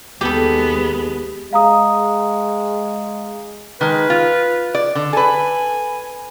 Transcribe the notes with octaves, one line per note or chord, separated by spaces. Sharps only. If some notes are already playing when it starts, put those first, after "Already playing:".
D#2 G#3 B3 G4 A4
G#3 F5 A#5 D#6
D#3 G#3 B4
F4
D5
D3
A4 B4 G#5